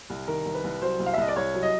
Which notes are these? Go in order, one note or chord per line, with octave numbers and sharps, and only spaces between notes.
C2
D#3 A#4
C2
B4
C2
F#3 C5
C2
F5
E5
C2 D#5
D5
C2 C#5
F#3
D#5